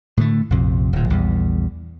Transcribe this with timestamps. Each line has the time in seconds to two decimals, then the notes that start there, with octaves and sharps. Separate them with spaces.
0.17 A2 D3 A3
0.50 A#1 F2 C3
0.93 D1 A#2
1.10 A#1 E2 G3